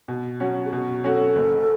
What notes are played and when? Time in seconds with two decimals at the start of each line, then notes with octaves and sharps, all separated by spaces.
0.08 B2
0.40 F#3 C#4 F#4
0.65 G#4
0.71 B2 F#4
1.04 F#3 C#4 F#4 A4
1.36 F#1